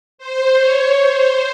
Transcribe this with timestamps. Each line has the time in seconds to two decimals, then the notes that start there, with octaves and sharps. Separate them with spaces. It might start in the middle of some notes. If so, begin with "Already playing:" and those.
0.18 C5
0.58 C#5
0.99 C5